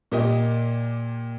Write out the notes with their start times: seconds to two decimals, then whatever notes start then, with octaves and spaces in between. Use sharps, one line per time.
0.12 A#2 A#3 G4 D#5